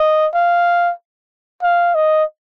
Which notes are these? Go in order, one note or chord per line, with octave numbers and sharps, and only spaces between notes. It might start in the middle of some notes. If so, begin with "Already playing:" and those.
Already playing: D#5
F5
F5
D#5